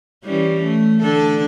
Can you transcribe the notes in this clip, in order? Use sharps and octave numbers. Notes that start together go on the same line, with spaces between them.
E3 G3 C#4
A3
D3 D4 A4